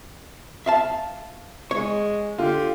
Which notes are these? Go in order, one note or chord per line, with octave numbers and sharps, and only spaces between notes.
E5 F5 A5
G#3 C#5
D3 F4 G4